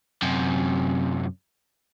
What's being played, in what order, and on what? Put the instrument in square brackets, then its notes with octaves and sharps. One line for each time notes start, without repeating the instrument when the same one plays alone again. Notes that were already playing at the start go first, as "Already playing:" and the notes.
[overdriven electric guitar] F#2 C3